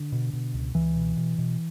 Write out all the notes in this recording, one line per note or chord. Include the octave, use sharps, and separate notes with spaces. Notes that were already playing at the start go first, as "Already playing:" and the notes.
Already playing: D3
B2
B2
C#2
C#2 E3
B2
B2
B2